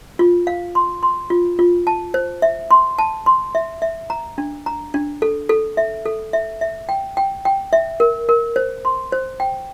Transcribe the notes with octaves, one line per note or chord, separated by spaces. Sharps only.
F4
F5
C6
C6
F4
F4
A5
C5
E5
C6
A5
C6
E5
E5
A#5
D4
A#5
D4
A4
A4
E5
A4
E5
E5
G5
G5
G5
E5
A#4
A#4
C5
C6
C5
G5